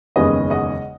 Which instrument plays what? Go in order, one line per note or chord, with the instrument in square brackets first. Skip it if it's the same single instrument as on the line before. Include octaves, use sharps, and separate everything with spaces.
[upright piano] F#1 E2 D#3 G#3 C#4 B4 D#5
D#5 F#5